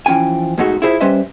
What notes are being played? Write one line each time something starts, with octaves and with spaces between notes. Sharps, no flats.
E3 F3 C#4 G5 G#5
G#2 B2 G#3 A3 D#4 F#4
E4 F4 G#4 C5 E5
G3 C#4 B4 C5 D#5 E5